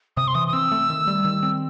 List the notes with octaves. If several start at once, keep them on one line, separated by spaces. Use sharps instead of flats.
C3 D#6
C6
E3 D#6
D#6
C4 E6
A3
D#3
G3
D#3
C4